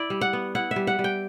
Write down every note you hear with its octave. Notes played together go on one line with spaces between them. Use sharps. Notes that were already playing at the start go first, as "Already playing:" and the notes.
Already playing: E4 D5
G3
F#5
B3
E4 F#5
E5
G3
F#5
G3
G5